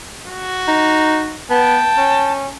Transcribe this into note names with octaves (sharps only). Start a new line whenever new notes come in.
F#4
D#4
B3 G5 A5
C#4